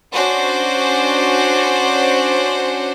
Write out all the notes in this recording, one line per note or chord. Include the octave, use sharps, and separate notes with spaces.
C#4 D4 F#4 C5